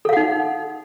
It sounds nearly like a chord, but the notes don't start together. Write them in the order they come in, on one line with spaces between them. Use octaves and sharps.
A4 F5 F#5 D#4